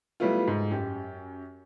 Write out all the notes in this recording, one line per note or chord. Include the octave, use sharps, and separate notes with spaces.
F#3 G3 A3 B3 E4 F4
G#2
F#2 G4